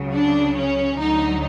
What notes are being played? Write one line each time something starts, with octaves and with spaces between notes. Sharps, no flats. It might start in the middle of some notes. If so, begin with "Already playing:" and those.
Already playing: C#2 C#3 F#3
D4
C#4
D2 D3 F#3 D#4